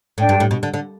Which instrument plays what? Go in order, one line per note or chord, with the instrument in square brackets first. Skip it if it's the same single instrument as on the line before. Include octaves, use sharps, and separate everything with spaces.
[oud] A2 [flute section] D4 A4 D5 G5
[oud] G2
A2
B2
D3
D3